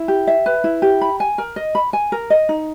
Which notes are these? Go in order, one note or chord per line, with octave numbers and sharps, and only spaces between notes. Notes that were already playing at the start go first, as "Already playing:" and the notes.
Already playing: E4
G4
E5
B4
E4
G4
B5
G#5
A#4
D#5
B5
G#5
A#4
D#5
D#4